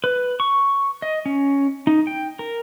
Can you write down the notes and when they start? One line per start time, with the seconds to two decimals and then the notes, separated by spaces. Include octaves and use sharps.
0.04 B4
0.40 C#6
1.02 D#5
1.26 C#4
1.87 D#4
2.07 G5
2.39 A#4